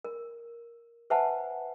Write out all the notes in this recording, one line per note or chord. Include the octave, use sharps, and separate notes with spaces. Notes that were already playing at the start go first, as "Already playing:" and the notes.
A#4
B4 C5 E5 F#5 G#5 A5